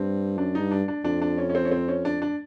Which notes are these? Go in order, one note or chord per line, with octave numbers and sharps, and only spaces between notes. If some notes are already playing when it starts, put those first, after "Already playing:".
Already playing: G2 C4
F#2 D4
G2 D#4
D4
D4
F2 D4
D4
C#4
C#4
C4
C#4
C4
C#4
D4
D4